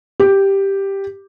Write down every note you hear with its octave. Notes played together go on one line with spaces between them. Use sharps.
G4